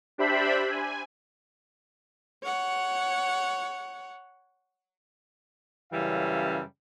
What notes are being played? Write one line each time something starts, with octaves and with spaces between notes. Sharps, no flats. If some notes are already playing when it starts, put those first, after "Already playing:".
D4 G4 C5 E5 B5
G#5
C#5 F#5
F#2 C#3 E3 G3 A4 F5